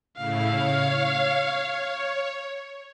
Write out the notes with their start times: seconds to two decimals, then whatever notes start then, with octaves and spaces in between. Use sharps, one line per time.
0.17 A2 C#3 E4 F5
0.48 C#5